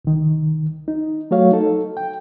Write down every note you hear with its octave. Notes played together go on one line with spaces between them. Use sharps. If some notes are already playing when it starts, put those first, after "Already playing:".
C2 D#3
D#4
F#3 A3 F#4 C#5 F5
D#4 A4
G5